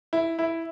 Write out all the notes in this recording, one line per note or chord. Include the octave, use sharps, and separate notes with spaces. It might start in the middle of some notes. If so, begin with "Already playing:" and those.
E4
E4